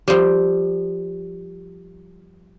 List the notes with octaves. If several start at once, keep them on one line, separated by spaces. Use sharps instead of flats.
F3 G3